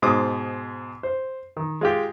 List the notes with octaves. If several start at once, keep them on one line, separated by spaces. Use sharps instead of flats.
G#2 B2 C5 C6 D6 D#6
C5
D#3
G#3 F4 G4